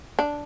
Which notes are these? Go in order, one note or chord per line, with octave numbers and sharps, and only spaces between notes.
D4